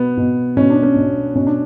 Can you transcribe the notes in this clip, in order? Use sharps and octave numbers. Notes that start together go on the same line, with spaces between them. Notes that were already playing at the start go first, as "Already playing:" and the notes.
Already playing: B2 B3
B2
B2 C#4
D4
C#4
B2
B2 C#4
D4